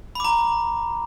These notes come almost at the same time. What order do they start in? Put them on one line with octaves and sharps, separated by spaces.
B5 D6 A#5